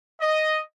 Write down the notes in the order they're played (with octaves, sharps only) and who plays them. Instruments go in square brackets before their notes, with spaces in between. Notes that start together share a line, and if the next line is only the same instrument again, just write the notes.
[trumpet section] D#5